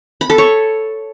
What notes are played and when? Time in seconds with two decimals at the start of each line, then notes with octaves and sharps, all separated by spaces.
0.21 B5
0.30 A4
0.38 C#5